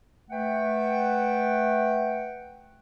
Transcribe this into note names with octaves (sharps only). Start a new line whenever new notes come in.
A3 B4 F#5 G5